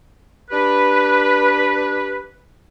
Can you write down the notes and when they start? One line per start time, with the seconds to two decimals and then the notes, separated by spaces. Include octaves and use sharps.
0.50 D4 G4 B4